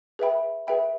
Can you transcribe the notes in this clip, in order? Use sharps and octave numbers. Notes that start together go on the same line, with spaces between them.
G#4 B4 E5 G5 B5
G#4 B4 E5 G5 B5